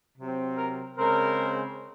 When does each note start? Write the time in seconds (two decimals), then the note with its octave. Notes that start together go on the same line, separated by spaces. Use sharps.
0.18 C3 F#3 C4
0.58 A#4
0.98 C#3 G#3 C4 A#4